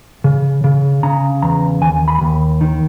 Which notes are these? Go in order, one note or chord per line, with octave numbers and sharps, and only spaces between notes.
C#3
C#3
C#3 A#5
E2 A#5
D#2 G#5
B5
D#2
D#3